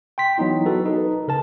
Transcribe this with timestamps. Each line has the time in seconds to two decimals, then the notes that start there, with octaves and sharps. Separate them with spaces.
0.18 G5 C6 B6
0.38 E3 F#3 B3 D#4 E4
0.66 F#4 A4 B4
0.85 D#4 A#4 B4
1.28 C#3 A#4 A5